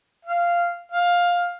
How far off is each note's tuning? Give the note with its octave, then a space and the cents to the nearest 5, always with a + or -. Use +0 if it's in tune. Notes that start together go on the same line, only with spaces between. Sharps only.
F5 -10
F5 +10